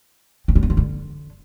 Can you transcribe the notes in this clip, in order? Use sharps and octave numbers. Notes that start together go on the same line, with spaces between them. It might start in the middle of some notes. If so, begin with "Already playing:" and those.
C4
C#4
B3
F4
D3